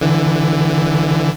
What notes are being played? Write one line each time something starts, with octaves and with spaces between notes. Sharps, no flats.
D3 E3